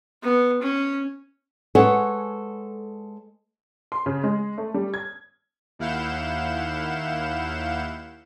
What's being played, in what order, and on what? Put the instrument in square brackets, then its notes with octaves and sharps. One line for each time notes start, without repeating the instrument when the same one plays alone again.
[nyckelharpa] B3
C#4
[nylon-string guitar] G#3 A4 B4 C#5 F#5 G#5
[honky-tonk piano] C6
C#3
G#3
A3
G3
G#6
[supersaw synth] D#2 E4 F5 F#5 G6 E7